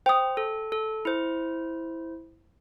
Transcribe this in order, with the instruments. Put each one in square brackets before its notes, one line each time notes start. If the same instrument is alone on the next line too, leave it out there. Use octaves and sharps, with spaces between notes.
[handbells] C5 [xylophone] G5 D#6
[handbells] A4
A4
E4 C5